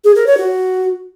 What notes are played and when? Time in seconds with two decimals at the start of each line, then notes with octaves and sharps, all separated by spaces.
0.05 G#4
0.16 A#4
0.27 C#5
0.38 F#4